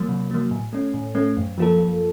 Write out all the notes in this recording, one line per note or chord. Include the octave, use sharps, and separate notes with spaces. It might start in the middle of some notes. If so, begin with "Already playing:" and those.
Already playing: F#3 A#3
C3
F#3 A#3
A2
A3 C#4
A2
A3 C#4
F#2
F3 A#3 F4 A4
F#2